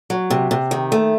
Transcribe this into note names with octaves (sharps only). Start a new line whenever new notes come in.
F#3
C3
C3
D#3
A3